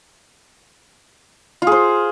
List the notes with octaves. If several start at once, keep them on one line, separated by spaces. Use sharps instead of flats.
F4 G#4 C5